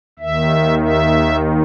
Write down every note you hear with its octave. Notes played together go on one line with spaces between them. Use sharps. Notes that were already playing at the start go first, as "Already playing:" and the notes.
D#2 D#3 E5
E5